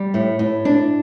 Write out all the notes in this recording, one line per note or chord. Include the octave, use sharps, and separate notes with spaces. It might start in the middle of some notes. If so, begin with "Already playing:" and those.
Already playing: G3
A2
A2
D4